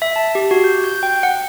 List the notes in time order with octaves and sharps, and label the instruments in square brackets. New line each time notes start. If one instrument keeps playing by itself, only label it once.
[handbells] E5
A5
G4
F#4
G6
G6
G5
F#5